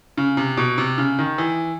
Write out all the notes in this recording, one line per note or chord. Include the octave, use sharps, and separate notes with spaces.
C#3
C3
B2
C3
C#3
D#3
E3